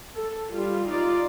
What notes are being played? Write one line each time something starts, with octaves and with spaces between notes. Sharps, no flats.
A4
G3 F4
D#4 F4 D5